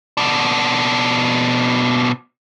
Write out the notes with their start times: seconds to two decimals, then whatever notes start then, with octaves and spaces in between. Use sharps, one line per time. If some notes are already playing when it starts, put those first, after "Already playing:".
0.17 B2 D4